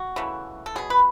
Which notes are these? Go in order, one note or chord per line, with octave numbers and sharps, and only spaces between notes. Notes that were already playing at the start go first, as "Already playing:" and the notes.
Already playing: F#4
C#3 E3 A3
A4
B2 F#3 B3 G#4
B4